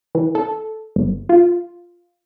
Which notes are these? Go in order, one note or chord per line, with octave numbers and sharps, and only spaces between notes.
E3
A4
G1
F4